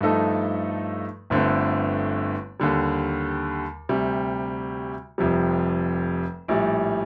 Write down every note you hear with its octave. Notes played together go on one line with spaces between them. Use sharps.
G2 F3 A3 D#4 A4
G1 G2 D3 A3 C4
D#2 D3 G3
D2 C3 G3
F1 F2 C3 G3
A#1 A2 G3